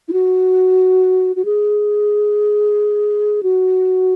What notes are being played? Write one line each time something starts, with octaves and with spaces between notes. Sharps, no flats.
E4
F#4
F#4
G#4
F#4